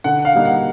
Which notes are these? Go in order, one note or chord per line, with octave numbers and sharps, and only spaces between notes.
D3 F#5
F5
G3 A#3 D#4
F#5